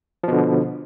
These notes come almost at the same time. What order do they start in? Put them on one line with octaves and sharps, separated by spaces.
F3 B2 D3